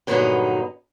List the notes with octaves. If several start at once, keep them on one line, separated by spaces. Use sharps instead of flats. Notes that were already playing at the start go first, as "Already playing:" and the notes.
G2 A#2 D3 F#3 B3 D#4